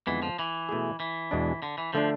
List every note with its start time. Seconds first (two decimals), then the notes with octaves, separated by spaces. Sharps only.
0.07 F2 D3 E3 G#3 B3
0.22 F3
0.39 E3
0.69 B2 A3 E4 G#4
1.00 E3
1.31 E2 B2 G#3 D4
1.62 D3
1.78 E3
1.93 D3 F3 A3 D4